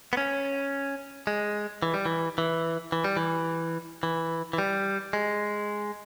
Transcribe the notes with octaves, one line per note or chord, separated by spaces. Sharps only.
B3
C#4
G#3
E3
G3
E3
E3
E3
G3
E3
E3
E3
G3
G#3